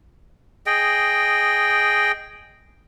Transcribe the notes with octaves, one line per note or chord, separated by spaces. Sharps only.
G#4 D#5 G5